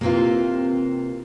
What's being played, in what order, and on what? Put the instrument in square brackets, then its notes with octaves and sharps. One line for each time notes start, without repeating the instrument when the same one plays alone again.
[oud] C3 E3 [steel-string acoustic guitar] A#3 C4 F4